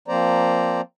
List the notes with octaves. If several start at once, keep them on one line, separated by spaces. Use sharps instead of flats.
F3 A#3 C4 C5 D5 A#5